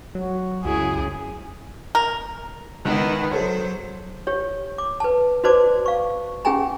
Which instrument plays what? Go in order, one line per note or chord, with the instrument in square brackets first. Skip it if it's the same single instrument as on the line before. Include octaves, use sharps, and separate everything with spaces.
[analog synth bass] F#3 [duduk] F#4
[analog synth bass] C#2 [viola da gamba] F#2 C#3 E4 [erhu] G#4
[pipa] A#4
[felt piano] C#2 [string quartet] D#3 B3 E4
[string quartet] F#3 C5 [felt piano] G#4 A4 C#5
[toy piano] G4 C#5
D6
B4 A5
F#4 B4 C5 D5 A5 D6
F5 C#6
C#4 G4 G#4 G5 G#5 A#5